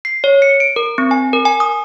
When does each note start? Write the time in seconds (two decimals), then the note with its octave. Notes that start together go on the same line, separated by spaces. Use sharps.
0.05 C7
0.24 C#5
0.42 C#7
0.60 D7
0.76 A#4
0.98 C4
1.11 G#5
1.33 A#4
1.45 G#5
1.60 D#6